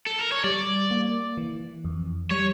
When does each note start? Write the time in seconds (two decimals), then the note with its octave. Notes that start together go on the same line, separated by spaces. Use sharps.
0.07 A4
0.19 A#4
0.32 C#5
0.44 G3 D5
0.91 A#3
1.37 E3
1.85 F2
2.30 G3 C#5